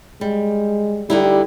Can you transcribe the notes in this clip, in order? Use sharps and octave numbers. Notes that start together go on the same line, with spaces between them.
G3 G#3
D3 G3 D#4 E4